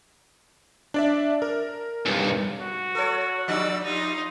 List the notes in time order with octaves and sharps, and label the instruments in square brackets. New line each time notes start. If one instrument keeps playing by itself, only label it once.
[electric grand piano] D4 D5 E5
A#4
[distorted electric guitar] B1 G2
[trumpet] F#4
[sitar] A4 C#5
[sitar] F3 G3 D4 [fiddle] D5 E6
[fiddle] D#4 F4